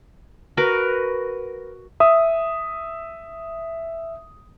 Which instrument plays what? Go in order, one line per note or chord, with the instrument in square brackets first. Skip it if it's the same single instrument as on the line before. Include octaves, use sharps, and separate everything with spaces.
[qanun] F#4 A#4 B4
[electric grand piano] E5 D#6